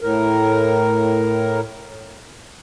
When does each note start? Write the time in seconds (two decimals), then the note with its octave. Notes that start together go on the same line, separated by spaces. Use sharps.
0.01 A2 A#4